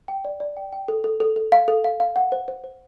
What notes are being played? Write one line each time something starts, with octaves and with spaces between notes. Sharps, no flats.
G5
D5
D5
G5
G5
A4
A4
A4
A4
F5
A4
F5
F5
F#5
C5
C5
C5